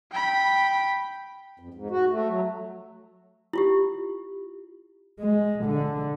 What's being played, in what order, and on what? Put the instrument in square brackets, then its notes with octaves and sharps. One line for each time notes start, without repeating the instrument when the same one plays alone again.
[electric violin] G5 B5
[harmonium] F2
G#2
F#4
A3
F#3
[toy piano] E4 F4 G4
[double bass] G#3
D3